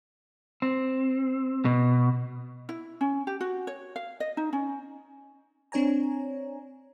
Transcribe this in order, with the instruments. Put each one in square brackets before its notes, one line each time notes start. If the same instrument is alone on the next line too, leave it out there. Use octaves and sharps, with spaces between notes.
[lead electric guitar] C4
B2
[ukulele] E4
C#4
G4
F#4
C#5
F5
D#5
D#4
C#4
[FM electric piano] C4 D4 C#5 G#5 A#5